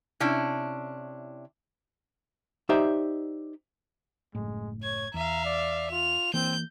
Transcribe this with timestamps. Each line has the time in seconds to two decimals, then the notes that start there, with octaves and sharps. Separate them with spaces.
0.20 C3 C#4 D4 E4
2.69 D#4 G4 C5 D5 E5
4.35 F#1 A2 G#3
4.83 C#5 G#6
5.14 E2 E5 F5 A#5
5.45 D5
5.91 F4 F7
6.34 E3 A#3 C4 G6